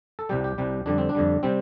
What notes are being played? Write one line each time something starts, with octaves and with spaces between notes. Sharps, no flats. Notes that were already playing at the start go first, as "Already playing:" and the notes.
A4
C2 C3 G3 G4
G4
C2 C3 G3
F2 D3 G3 D4
C4
D4
F2 D3 G3
C3 G3 C4